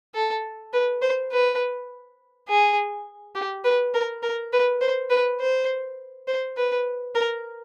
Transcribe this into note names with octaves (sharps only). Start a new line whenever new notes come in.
A4
B4
C5
B4
G#4
G4
B4
A#4
A#4
B4
C5
B4
C5
C5
B4
A#4